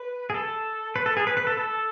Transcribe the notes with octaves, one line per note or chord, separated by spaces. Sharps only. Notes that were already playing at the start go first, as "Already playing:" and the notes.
Already playing: B4
G#4
A4
B4
A4
G#4
B4
B4
A4
A4